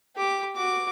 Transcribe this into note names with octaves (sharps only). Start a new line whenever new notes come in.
G4 D6
F#4 D6